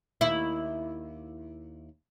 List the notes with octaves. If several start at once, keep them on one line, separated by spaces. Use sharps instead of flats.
D#2 E4